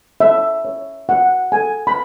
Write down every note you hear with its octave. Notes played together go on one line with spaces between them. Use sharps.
C#5 E5
C#5
F#4 F#5
A4 G#5
B5